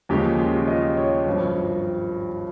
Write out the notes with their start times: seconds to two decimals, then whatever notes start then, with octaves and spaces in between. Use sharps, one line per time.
0.09 D#2 C#3 F3 G#3 G4
0.40 F4
0.68 D#5
0.97 C#5
1.26 G#1 G2 F3